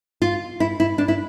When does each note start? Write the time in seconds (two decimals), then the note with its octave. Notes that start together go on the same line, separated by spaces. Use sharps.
0.22 F4
0.60 E4
0.80 E4
0.98 D4
1.08 E4